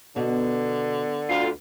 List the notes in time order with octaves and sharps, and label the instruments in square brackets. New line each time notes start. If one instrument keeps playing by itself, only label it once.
[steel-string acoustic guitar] B2 [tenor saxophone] D3
[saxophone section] D2 F4